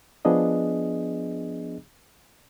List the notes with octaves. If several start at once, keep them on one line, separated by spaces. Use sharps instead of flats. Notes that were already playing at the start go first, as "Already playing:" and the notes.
F3 B3 D4 G#4 D#5